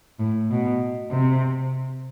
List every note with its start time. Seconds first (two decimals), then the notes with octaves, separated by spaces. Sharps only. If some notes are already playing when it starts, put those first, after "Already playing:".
0.19 A2
0.50 B2
1.11 C3